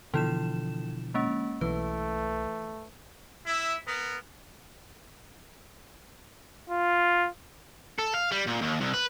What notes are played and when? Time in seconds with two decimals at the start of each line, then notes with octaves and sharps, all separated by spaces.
0.14 B2 D3 E3 F3 E4 E7
1.14 G#3 A#3 C#4
1.61 B1 E3 A3 B4
3.44 E4 E5
3.86 B3 A#4
6.69 F4
7.99 A4
8.14 F5
8.31 G3
8.47 A#2
8.61 D#2
8.80 C2
8.93 B4